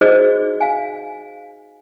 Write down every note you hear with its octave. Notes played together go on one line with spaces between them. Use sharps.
D#4 F#4 G#4 C5 D5 D#5
F5 G#5